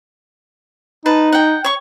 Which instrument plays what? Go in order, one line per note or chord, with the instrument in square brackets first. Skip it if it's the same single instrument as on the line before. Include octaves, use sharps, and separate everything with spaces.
[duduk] D#4 [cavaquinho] B4 A5
[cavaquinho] F#5 G5
C#5 C#6